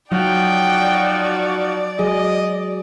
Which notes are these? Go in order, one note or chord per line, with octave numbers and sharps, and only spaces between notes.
F3 F#3 D#4 F#4 D5 G5
F#3 G#4 D#5